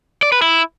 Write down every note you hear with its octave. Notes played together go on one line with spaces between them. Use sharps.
D5
B4
E4